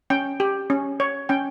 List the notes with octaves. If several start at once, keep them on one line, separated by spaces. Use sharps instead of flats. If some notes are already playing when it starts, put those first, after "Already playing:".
C#4 G5
G4
C#4
C#5
C#4 G5